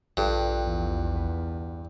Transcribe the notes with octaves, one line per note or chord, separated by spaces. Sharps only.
A#1 G2 F4 A4 G5
E2
B3